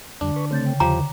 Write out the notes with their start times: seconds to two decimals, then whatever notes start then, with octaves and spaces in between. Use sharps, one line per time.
0.21 F2 D3 G3 D4
0.36 B4 C#6
0.51 C#3 A3 C4 G6 A6
0.66 G5
0.80 E2 D3 F3 G4 A#5 D6